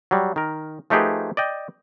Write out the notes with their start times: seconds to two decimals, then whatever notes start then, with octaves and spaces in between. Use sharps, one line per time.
0.11 F#3 G3
0.36 D#3 A#4
0.90 F3 A3 D#4 G4 G#4 B4
1.37 D5 D#5 G5